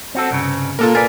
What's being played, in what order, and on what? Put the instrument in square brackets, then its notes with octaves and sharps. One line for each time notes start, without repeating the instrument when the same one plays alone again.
[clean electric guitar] C4 F#4 A4
C2 G2 C#3
[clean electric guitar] A#2 A#3 [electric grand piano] F4 A4 A#4
[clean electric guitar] F4 B4 D5 [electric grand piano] A#4 G#5